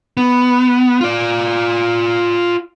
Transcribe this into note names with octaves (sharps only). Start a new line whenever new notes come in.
B3
F4 D5